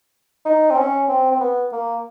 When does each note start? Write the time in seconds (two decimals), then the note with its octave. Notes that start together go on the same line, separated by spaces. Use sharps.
0.45 D#4
0.70 C4
0.78 C#4
1.08 C4
1.32 C4
1.40 B3
1.72 A#3